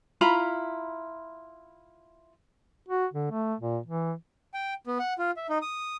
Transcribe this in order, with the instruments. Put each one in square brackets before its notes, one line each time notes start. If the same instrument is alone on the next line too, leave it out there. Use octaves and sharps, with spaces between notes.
[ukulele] E4 F4 A#5 B5
[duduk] F#4
D3
A3
A#2
E3
[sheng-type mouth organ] G5
B3
F#5
F4
E5
D#4
D#6